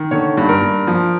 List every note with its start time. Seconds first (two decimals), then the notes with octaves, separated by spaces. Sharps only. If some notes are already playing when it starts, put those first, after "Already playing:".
Already playing: D#3
0.11 D3 C#5
0.37 G2
0.49 A#4
0.61 G2
0.87 F3